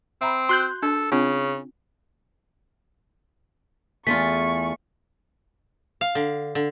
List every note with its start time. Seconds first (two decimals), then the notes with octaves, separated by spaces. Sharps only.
0.21 C4 E5 A#5 B5
0.49 F#4 C6 F#6 G6
0.82 D4 A4
1.12 C#3 C4 D4 F4
4.07 E2 A3 F4 G#4 C#6 B6
6.01 F5
6.15 D3
6.55 D3